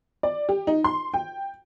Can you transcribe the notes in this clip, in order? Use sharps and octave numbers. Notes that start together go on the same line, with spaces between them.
D5
G4
D#4
C6
G5